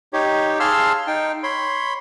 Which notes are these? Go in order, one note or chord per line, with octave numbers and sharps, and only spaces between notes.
D#4 G4 C#5
G#4 F5 A5 C6 E6 F6
D#4 G5
C#5 B5 C6